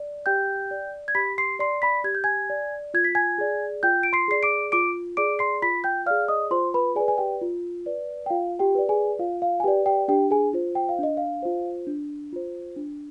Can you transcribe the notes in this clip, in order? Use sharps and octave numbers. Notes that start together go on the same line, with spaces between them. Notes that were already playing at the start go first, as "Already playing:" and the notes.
Already playing: D5
G4 G5 G6
D5
G#6
G4 B5 B6
C6 C7
D5 C6 C7
B5 B6
G4 G#6
G6
G#5 G#6
D5
F4 G#6
B6
G#5 G#6
G#4 D5
F4 G5 G6
D7
C6 C7
G#4 D5 C7
D6 D7
F4 D6 D7
G#4 D5 D6 D7
C6 C7
F4 B5 B6
G5 G6
G#4 D5 F5 F6
D#5 D#6
F4 C5 C6
B4 B5
G#4 B4 D5 G#5
G#5
G4 G5
F4
B4 D5
G5
F4 F5
G4 G5
B4 D5
G#4 G#5
F4 F5
F5
G#5
G4 B4 D5 G5
G4 G5
D4 G4 G5
G#4 G#5
F4 C5
G5
F5
D4 D#5
F5
F4 C5
D4
F4 C5
D4